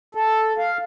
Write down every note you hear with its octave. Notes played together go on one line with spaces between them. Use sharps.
A4
F5